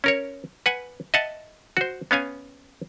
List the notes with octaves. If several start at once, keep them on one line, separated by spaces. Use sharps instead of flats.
C#4 A#4 C#5
B4 F#5 G#5
D#5 E5 F#5 A5
F#4 C5
B3 C#4 F5 G#5